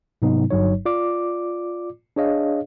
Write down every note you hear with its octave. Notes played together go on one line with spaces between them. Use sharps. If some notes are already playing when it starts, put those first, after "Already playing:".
G#2 C3 F#3 B3 D#4
G1 G2 F#3 D#4 C#5
F4 D5 D6
D4 G#4 C#5 D#5 F5